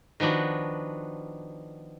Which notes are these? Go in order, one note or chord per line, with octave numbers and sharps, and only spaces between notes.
D#3 F3 B3 D4 F#4